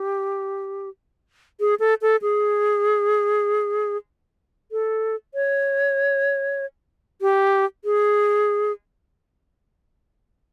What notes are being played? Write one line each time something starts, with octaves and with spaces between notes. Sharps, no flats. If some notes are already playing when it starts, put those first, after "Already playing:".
Already playing: G4
G#4
A4
A4
G#4
A4
C#5
G4
G#4